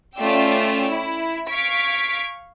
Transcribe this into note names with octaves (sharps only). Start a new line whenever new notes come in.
A3 C#4 F4 D5 G5 E6
E4
F5 C#6 G#6 B6 D7